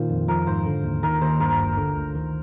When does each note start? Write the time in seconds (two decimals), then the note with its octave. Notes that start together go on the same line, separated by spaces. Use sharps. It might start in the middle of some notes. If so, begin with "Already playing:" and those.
Already playing: A#2 D#3 F4 C5
0.10 F2
0.28 F3 A#4
0.47 G#2 C5
0.66 D3
0.84 D#2
1.03 D#3 A#4
1.21 D#2 C5
1.40 G2 A#4
1.58 G#1
1.77 D3
1.96 D2
2.15 D#3